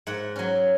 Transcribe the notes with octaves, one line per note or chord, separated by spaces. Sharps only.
G#2 F#5
F#3 C#4